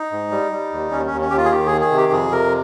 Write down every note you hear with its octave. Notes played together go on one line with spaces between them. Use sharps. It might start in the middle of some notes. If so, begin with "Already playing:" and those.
Already playing: D#4
G#2
G3
G3
D#2
D#2 C#4
C#4
D#2
C#4
D#2 G4
F4
G#4
D#3 G4
D#3 G#4
G#4
C3
G4
F2 G#4
C3 A#4